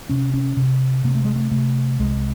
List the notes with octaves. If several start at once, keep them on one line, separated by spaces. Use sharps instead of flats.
C3 C#4
C#4
C3
C3 A#3
A3
G#3
A3
C3 A3
C2 G#3